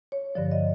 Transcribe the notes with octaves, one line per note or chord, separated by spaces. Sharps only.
C#5
G2 D3 F3 D5
D#5